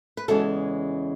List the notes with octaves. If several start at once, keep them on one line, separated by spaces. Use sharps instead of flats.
B4
E2 C#3 E3 G#3 C#4 F#4 A4